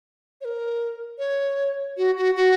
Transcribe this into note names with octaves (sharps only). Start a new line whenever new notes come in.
C#5
A#4
C#5
F#4
F#4
F#4